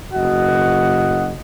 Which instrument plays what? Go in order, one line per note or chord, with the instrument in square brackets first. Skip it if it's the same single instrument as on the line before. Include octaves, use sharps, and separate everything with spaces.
[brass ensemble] F#1 F#4 D#5 F#5